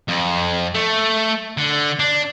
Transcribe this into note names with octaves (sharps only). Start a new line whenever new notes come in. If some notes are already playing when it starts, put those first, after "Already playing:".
F2
A3
D3
D4